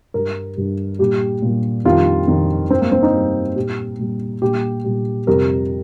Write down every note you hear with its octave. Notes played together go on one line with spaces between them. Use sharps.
G2 G3 A#4
G2 G3
A#2 G3 G4
A#2 G3
F2 D#3 G3 F4
F2 D#3 G3
G2 G3 C4
A#3
C4
D#4
G2 G3
A#2 G3 G4
A#2 G3
A#2 G3 G4
A#2 G3
F2 C3 G3 A#4